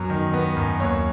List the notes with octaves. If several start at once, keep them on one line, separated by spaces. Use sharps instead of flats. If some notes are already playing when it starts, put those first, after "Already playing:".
Already playing: F#2 F#3 B3
D#3
B3
F#2
D#2 C#5